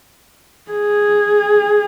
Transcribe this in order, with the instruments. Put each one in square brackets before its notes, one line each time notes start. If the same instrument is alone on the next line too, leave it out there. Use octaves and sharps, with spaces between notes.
[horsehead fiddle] G#4